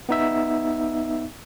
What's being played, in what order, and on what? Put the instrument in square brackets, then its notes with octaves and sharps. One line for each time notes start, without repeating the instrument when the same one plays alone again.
[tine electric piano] B3 D#4 E5